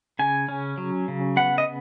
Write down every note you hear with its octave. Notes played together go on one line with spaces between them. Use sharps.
C#3 G#5
C#4
F#3
C#3
B3 F#5
D#5